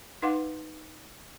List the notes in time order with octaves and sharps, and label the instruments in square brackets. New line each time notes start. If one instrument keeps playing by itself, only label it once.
[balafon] D#4 B4 F5 F#5 C6 D6